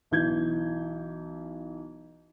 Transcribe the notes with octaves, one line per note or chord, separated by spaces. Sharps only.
B1 E3 G6 G#6